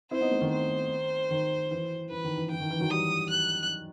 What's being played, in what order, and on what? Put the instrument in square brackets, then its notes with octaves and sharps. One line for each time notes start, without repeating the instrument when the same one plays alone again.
[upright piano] C4 E4 [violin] C5
[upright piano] B3 D#4
A3 C4
D#3
[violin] C5
[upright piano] D#3
E3
[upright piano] E3 [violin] B4
[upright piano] D#3
E3
[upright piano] E3 [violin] G5
[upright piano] D#3
E3
D#3 F#3
[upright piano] E3 G3 [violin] D#6
[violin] F#6